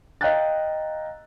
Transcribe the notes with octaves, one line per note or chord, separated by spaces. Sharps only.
D#5 F5 G5 A#5 F#6 A6